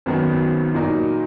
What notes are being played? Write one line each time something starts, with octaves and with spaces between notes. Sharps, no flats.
G#1 F#2 D#3 F#3 B3
A#2 F#3 A#3 D#4